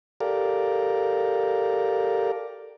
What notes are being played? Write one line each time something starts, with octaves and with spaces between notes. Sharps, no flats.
G4 A4 A#4 D5 F5